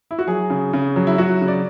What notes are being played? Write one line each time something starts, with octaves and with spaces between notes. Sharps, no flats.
E4
F#4
F#3 G#4
C#3
C#3
F#3
E4
F#3 F#4
C#3
D5